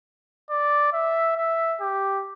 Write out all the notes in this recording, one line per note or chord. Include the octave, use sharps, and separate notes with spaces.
D5
E5
E5
G4